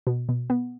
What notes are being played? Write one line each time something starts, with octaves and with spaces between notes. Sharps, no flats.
B2
B2
B3